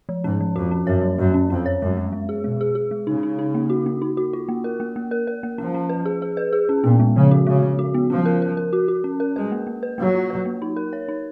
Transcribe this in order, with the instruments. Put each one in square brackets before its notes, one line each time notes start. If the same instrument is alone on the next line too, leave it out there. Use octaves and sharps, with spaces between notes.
[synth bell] F3
[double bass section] G#2 [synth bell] C#4
[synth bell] F3
[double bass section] F2 [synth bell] F#4
[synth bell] C#4
[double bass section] F#2 [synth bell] C#5
[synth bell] F#3
[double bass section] F#2 [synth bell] F#3
[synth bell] C#4
[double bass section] F2 [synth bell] C#4
[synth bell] C#5
[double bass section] F#2 [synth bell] G#3
[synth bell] G#3
G#3
G#4
[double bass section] B2 [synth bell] G#3
[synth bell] G#4
G#4
G#3
[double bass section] C#3 [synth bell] D#4
[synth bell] D#4
D#4
A#3
F#4
A#3
D#4
F#4
F4
A#3
A#4
A#3
A#3
A#4
A#4
A#3
[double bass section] F3 [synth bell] C#4
[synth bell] C#4
B4
G#4
G#4
B4
G#4
C#4
[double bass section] A#2 [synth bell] B3
[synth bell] G#3
[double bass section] C#3 [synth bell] F3
[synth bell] F#4
[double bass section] C#3 [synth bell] G#3
[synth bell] F3
F#4
B3
[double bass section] F3 [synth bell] C#4
[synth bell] A#4
A#4
A#4
F#4
F#4
C#4
A#4
[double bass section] G#3 [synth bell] B4
[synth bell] A#3
A#3
B4
[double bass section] F#3 [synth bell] A#3
[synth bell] F4
B4
A#3
D#4
A#4
C#5
D#4